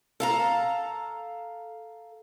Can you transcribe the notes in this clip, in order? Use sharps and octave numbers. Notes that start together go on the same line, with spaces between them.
A4 F5 A#5